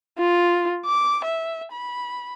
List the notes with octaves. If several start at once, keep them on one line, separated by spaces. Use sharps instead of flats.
F4
D6
E5
B5